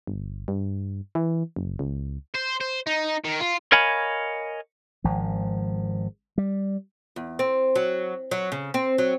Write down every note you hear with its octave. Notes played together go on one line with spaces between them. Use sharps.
G1
G2
E3
F#1
C#2
C5
C5
D#4
D#3
F4
A#4 C#5 D#5 F5 G#5 B5
G#1 F3
G3
E2
C4
F#3
F#3
C#3
C4
F#3